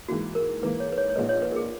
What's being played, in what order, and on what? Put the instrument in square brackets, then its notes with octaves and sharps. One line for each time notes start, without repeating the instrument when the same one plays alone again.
[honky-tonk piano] G#2 E3 A#3 [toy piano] F#4
[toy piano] A#4
[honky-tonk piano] G#2 E3 A#3 [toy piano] B4
[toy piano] C#5
B4
C#5
C#5
[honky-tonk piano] A#1 A#2 G#3 D#4 [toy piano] B4
[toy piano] C#5
B4
A#4
G#4